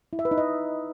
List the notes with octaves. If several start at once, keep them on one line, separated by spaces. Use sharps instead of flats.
E4
E5
B4
D#4
D#5